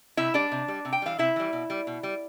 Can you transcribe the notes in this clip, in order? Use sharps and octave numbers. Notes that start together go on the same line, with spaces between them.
C3 E4 E5
G3 D4 D5
C3
G3
C3
G5
E3 G3 F5
C3 E4 E5
E3 G3
B2
G3
B2
G3